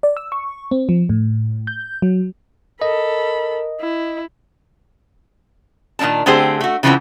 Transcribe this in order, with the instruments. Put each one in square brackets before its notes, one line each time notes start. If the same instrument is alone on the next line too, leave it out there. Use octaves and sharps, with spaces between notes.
[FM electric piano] D5
E6
C#6
C4
F3
A2
G6
F#3
[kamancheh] A4 B5 [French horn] A#4 [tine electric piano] D#5
[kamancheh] E4
[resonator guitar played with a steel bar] A#2 D#3 C4 D4 A5
D3 A3 C4 G4 G#4 C5
A3 F#4
C#3 E3 F3 A3 B3 C4